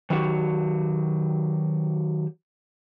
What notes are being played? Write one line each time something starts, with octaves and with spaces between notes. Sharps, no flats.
D#3 F#3 F#4 G4